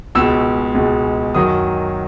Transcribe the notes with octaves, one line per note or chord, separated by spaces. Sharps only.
C#2 B2 G#3 E6
C#2 B2 G#3
F#2 D#3 F#3 D#6